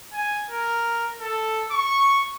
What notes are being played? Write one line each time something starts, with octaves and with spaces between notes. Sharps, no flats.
G#5
A#4
A4
C#6